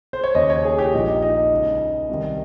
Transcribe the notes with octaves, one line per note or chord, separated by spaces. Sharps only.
C5
C#5
D#2 C#3 D#5
C#5
G#4
G4
A#1 A#2 D#4
D#4
C#2 C#3
C2 C3 D#3